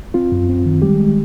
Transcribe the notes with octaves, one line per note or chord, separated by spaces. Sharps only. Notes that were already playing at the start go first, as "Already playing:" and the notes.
C4 F4
F#2
C4
D#3
G3 G#3 G4
G#3